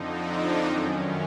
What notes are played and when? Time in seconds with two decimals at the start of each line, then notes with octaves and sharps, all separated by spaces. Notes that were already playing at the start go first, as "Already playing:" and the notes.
Already playing: F2 D3 F3 D#4
0.18 D4
0.65 F#2 D#3 C#4